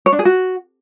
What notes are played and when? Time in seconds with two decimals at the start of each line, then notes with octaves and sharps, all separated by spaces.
0.06 C#5
0.12 D4
0.19 G#4
0.25 F#4